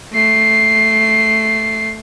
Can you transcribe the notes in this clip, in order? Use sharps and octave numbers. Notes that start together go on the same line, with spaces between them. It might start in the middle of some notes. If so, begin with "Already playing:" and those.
A3 C7